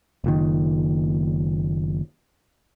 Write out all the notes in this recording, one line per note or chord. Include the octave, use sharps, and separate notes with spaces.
F#1 A#2 D#3